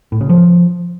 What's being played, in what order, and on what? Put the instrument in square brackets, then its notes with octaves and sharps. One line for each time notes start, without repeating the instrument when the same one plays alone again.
[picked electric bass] A2
C#3
F3